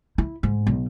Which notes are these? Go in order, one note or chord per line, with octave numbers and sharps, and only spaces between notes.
E4
G#2
B1